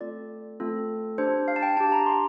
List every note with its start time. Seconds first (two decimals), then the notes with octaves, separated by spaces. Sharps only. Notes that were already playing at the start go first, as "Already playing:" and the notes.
0.01 A3 C4 F4 A4 D5
0.60 A3 C4 F4 A4
1.18 D4 G4 C5
1.48 F5
1.56 A5
1.63 G5
1.77 D4 A5
1.80 G4
1.92 A#5
2.06 C6